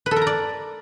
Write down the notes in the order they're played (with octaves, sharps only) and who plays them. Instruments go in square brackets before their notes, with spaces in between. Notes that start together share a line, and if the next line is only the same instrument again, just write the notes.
[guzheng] B4
A4
A#4
A#5
D5